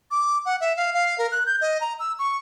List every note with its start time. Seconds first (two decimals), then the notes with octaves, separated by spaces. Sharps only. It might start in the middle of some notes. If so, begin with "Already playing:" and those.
0.11 D6
0.45 F#5
0.61 E5
0.77 F5
0.94 F5
1.18 A#4
1.32 F#6
1.46 G6
1.61 D#5
1.81 A#5
1.99 E6
2.19 C#6